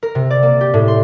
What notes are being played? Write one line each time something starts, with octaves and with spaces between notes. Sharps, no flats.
A#4
C3
D5
A#3
G4
A2
C6